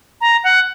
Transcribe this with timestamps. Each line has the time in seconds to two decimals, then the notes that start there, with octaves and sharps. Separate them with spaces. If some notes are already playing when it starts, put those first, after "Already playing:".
0.21 A#5
0.44 F#5